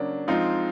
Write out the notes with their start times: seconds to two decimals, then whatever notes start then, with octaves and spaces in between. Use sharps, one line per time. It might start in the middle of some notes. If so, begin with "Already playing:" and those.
Already playing: C#3 F#3 A#3 D4
0.27 F3 G#3 C4 D#4 F4